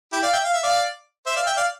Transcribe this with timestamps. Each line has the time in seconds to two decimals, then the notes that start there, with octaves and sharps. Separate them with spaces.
0.13 E4 G4
0.23 D5 F5
0.33 E5 G5
0.44 F5
0.53 E5
0.62 D5 F5
1.26 C5 E5
1.36 D5 F5
1.47 E5 G5
1.57 D5 F5